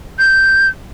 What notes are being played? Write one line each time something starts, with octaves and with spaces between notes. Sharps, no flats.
G6